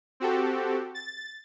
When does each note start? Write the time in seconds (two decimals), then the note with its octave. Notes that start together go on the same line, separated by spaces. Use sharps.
0.20 C4 F#4 G4 A4
0.95 A6